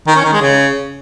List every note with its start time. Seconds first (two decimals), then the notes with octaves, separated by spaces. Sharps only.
0.08 D#3
0.16 C#4
0.25 D#3
0.33 G#3
0.42 C#3